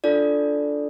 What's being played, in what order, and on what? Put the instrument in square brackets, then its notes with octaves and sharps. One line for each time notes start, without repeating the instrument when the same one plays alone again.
[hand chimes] D4 F4 A4 D5